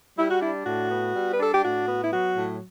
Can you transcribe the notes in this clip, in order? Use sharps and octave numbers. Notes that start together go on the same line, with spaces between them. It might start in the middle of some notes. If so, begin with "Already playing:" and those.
G3 E4
F#4
D4 E4
A2 F#4
B3
G3
B4
D4 A4
G4
A2 F#4
B3
E4
F#3 F#4
A2